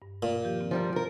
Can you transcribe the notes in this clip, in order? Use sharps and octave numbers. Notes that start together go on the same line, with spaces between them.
G2
A#2 F5
D#3 F3 G4
C4 F4
F3 G3 A#4
F3 A#4